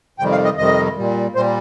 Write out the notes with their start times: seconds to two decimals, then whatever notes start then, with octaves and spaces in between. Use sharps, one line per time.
0.18 F2 C3 D#3 G3 G5
0.32 F5
0.45 D#5
0.58 F2 C3 D#3 G3 D#5
0.97 A#2 G3
1.35 A#2 G3 C5